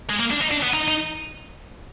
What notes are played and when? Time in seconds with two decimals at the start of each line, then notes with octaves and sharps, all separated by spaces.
0.10 G#3
0.20 A#3
0.31 D4
0.41 D#4
0.51 D4
0.62 B3
0.73 D#4
0.88 D#4